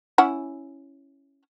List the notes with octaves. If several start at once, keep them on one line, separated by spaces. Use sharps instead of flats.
C#4 E4 F#5